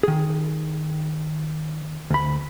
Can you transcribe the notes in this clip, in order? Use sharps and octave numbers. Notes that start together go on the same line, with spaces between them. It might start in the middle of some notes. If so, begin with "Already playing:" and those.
D#3 G#4
D2 B5